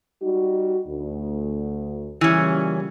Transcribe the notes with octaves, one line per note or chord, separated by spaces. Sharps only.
G3 D#4 F#4
D2
A#2 C#3 E3 G3 C#4